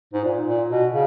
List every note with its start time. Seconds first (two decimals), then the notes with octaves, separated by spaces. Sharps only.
0.13 G#2
0.24 A#2
0.46 A#2
0.70 B2
0.92 C#3